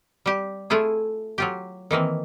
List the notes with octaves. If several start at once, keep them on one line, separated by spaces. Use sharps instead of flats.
G3 G4
A3 E4 F4 G#4
F#3 F4 G4
D#3 E3 A#3 C4